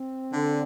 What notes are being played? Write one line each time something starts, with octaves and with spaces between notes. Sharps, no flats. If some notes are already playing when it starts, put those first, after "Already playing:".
Already playing: C4
D3